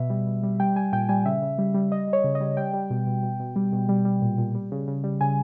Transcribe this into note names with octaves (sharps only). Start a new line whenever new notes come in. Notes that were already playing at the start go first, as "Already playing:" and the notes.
Already playing: B2 E5
G3
B2
G3
G3 G5
G3 G#5
A#2 G5
G3 G#5
C#3 E5
C#3
G3
G3
G3 D#5
G3
C#5
C#3
D#5
G3
G3 G5
G3
B2
B2
B2
B2
G3
B2
G3
G3
A#2
A#2
G3
C#3
C#3
G3
C#3 G#5